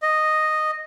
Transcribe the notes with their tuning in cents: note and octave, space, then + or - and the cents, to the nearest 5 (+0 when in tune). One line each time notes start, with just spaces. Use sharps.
D#5 -5